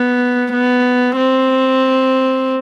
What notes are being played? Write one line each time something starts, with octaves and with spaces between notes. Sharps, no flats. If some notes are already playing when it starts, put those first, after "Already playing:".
Already playing: B3
B3
C4